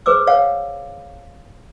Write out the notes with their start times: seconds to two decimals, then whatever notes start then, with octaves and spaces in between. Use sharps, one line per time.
0.06 G#4 B4 C5 D6 E6
0.27 C#5 F5 F#5